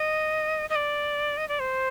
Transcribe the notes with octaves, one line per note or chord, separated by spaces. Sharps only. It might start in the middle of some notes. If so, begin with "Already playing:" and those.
Already playing: D#5
D#5
D5
D#5
D5
C5